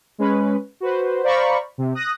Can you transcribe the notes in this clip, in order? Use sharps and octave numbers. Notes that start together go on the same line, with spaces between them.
G#3 C#4 B4
F#4 B4 C5
C5 D5 F5 A#5 B5 C#6
C3
D#6 F#6 A#6